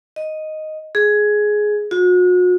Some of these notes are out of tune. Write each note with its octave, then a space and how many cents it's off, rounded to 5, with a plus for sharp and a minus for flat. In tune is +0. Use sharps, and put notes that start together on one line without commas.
D#5 +0
G#4 +10
F#4 -40